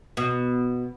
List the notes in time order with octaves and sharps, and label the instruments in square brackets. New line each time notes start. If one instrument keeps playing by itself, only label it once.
[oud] B2